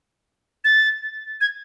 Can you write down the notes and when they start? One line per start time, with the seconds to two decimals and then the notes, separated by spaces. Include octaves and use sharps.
0.65 A6
1.41 G#6